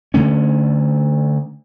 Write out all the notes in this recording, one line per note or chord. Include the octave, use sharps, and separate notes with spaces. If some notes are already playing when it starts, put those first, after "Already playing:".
D3 A3 C#4